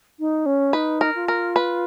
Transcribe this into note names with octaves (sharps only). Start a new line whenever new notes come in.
D#4
C#4
D#4 B4
A#4
F4
A#4
B4